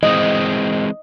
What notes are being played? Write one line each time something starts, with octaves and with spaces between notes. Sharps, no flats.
E3 G#3 C4 D#5